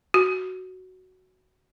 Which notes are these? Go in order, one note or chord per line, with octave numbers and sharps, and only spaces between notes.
F#4